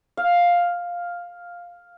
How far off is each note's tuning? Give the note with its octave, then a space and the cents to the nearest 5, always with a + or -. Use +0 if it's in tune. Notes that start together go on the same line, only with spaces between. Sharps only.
F5 +5